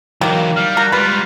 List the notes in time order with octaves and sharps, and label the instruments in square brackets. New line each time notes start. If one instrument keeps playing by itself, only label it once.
[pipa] D#3 A#3 [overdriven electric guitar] E3 F#3
[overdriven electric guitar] G3 [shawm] F5
[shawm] F#4 [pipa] A#4
[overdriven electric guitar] G#2 G3 [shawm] F4 [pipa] B4